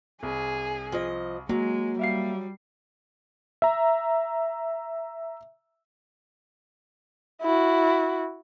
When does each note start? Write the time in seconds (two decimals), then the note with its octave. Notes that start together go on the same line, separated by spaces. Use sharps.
0.23 C2 G#4
0.92 F3 D#5
1.49 F#3 G#3 A#3
1.99 G3 E5 F5 C7
3.62 E5 A#5
7.43 E4 F#4